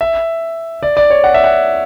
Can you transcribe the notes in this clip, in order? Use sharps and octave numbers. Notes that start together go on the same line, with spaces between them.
E5
D5
D5
C#5
F#5
E5
F#5